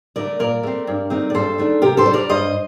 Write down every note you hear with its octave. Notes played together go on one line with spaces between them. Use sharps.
D3 A3 A#4 D5
A#2 A#4 D5
A3 C4
G2
D#3 A3 C4 D#4
D5
G2 A4 C5
D#3 A3 D4
C3 G4 A#4
A4 C5
G3 D4
A#4 D5
G2 C5 D#5